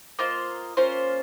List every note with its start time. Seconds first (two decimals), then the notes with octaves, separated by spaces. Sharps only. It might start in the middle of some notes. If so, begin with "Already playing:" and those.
0.19 A#3 F4 C5 D#5
0.77 A#3 C#4 F4 C5